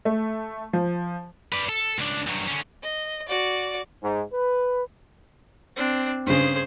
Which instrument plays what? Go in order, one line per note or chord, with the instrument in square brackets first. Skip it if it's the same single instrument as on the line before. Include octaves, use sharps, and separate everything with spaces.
[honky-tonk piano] A3
F3
[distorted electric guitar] B4 D5
A4
C#2 D4
G2 F#3
D3 C#4
[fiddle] D#5
F#4 D5
[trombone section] G#2
B4
[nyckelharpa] C4 D4
[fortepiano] G2 C#3 [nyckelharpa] G#4 C5